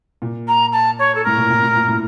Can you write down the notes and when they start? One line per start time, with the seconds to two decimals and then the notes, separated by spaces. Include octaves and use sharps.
0.22 A#2
0.47 A#5
0.72 A5
0.98 C#5
1.15 A4
1.24 A2 A#4
1.37 A#2
1.50 A#2
1.63 A#2
1.76 A#2
1.88 A2